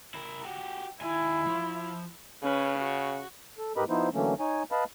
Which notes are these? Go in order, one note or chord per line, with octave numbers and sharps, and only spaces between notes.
E4 A#4
F#4 G4
D#2 E4 G#5
F3
C#3 C#4 B4
F#4
A4
G#2 G4 A#4 B4 D#5 B5
F3 B3 D#4 E4 C5
D3 E3 F#3 A3 A#3 C#4
D#4 C#5 G#5
B4 D#5 F5 A5 B5